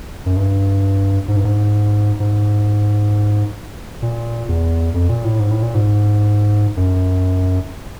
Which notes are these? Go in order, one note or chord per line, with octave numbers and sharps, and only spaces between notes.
F#2
G2
G#2
G2
G#2
G#2
A#2
E2
F2
A#2
A2
G#2
A2
A#2
G#2
F#2